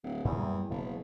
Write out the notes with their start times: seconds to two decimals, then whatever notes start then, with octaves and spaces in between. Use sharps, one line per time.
0.03 D1
0.25 E2 A#2
0.37 F#2 G3 A#3
0.70 F#1 B2 F3